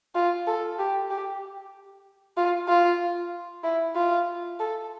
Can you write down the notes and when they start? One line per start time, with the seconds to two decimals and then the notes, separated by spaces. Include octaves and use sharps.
0.15 F4
0.47 A4
0.78 G4
1.10 G4
2.37 F4
2.68 F4
3.64 E4
3.95 F4
4.59 A4